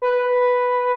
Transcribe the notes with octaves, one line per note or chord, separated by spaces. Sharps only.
B4